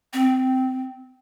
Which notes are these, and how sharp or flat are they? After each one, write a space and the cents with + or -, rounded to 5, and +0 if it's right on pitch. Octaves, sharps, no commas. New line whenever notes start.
C4 -15